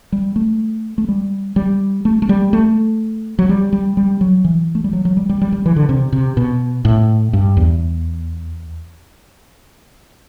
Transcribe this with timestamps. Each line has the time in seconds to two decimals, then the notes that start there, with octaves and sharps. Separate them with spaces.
0.12 G3
0.36 A3
0.98 A3
1.09 G3
1.56 G3
2.05 A3
2.22 A3
2.29 G3
2.53 A3
3.39 F#3
3.49 G3
3.73 G3
3.97 G3
4.21 F#3
4.44 E3
4.75 A3
4.84 G3
4.93 F#3
5.05 F#3
5.17 G3
5.29 G3
5.42 G3
5.52 G3
5.66 E3
5.76 D3
5.89 C3
6.12 C3
6.37 B2
6.85 A2
7.33 G2
7.57 E2